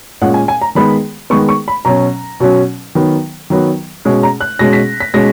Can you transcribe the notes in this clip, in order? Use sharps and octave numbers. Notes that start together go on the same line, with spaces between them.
A#2 G#3 C#4 F#5
G#5
G#5
A#5
D#3 G#3 B3 B5
D#3 G#3 B3 C#6
C#6
B5
B2 F#3 C#4 A#5
B2 F#3 C#4
D#3 F#3 B3
D#3 F#3 B3
B2 G#3 C#4
A#5
F#6
B2 G#3 C#4 A#6
B6
B6
B2 G#3 C#4 A#6